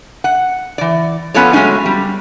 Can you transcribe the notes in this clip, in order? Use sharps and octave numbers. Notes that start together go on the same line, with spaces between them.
F#5
E3 D5
F3 B3 C#4 F4 A4 C#5
F#3 G#3 A3 C#4 D#4
G3